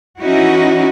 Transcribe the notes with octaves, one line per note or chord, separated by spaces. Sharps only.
E3 C#4 D#4 E4 F#4